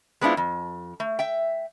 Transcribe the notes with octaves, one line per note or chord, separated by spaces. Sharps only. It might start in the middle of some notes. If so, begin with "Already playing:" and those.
G#3 B3 C4 D4 E4 F4
F2
A3
E5 G5